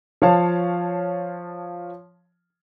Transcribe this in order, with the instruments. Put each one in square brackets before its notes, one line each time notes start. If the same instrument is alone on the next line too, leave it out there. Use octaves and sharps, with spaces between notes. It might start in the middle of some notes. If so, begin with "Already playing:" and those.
[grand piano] F3 C#5 F5 A5